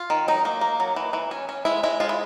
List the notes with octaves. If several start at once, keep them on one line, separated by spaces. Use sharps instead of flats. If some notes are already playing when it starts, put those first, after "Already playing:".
Already playing: F4
D#3
F#3 D#4
A#3
A#3
F#3
E3
E3
C#4
C#4
G#3 E4
G#3 E4
G#3 F4
E4